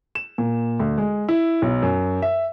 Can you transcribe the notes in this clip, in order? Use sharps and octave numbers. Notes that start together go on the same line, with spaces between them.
E7
A#2
D2
G#3
E4
B1
F#2
E5